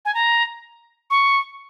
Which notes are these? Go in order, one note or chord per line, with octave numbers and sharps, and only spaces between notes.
G#5
A#5
C#6